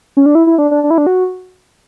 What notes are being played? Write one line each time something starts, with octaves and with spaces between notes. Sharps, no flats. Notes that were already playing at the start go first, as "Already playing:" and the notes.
C#4
D4
E4
E4
D4
D4
D4
E4
D4
F#4